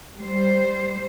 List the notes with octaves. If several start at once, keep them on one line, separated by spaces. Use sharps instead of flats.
G3 C5